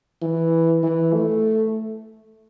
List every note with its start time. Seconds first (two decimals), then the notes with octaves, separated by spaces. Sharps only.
0.22 E3
0.83 E3
1.14 A3